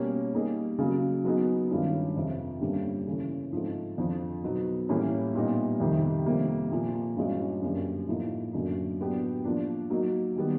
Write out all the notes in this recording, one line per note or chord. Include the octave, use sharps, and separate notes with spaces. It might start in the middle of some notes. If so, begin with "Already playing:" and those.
Already playing: B2 G3 A#3 C#4
G3 A#3 D#4 G#4
C#3 F#3 A#3
F#3 B3 D#4 G#4
G2 D#3 G#3 C#4 F4
F2 C3 F3
G2 D3 G3 A#3 C#4
C#3 E3 A3 C#4
G#2 F3 A3 C4 D#4
F2 D3 F3
B2 F#3 B3 D#4
A2 E3 G3 A#3 C#4
A#2 G3 B3 D#4
F2 C3 D#3 G3
F2 C3 D#3 G3 A#3
A#2 F3 A#3
G2 E3 G#3 C#4 F#4
F#2 D3 G3 A#3 D4
A2 F3 A#3 D#4
F#2 D3 F#3 A#3
A2 F#3 B3 D4 G4
F3 A#3 D4
F#3 A#3 D#4 F#4
D#3 G3 B3